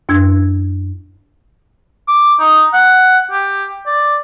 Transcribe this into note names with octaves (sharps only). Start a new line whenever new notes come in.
F#2 D4 E6 G#6
D6
D#4
F#5
G4
D5